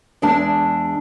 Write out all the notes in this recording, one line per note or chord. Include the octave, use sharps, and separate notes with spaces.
E2 G#3 D4 A5